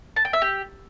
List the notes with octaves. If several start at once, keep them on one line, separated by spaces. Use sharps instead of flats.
A5
G5
E5
G4